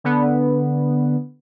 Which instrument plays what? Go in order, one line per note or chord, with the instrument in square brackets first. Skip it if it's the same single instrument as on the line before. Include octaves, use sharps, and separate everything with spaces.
[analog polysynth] D3 B3